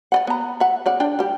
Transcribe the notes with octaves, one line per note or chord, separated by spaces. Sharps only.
D5 D#5 F#5
B3 A#5
E5 F#5
C#3 D5 F#5
D4 D5 G5
G3 G4